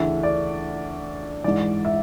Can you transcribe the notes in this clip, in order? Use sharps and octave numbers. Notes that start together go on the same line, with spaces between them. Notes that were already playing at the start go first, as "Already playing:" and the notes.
Already playing: D2 C#3 E3 E5
D5
G#2 E3 D5
E5